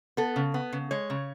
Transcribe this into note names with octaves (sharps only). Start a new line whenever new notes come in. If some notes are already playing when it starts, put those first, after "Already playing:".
B3 A4
C#3
B3
C#3
G#3 C#5
C#3